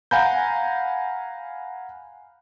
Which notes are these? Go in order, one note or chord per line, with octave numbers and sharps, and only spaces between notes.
F5 F#5 G#5 A#5 B5 G6